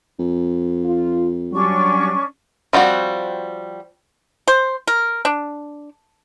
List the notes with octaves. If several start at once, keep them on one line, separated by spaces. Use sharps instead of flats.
F2
F4
F#3 G3 C#4 D4 C#6
F3 G3 C4 F#4
C5
A#4
D4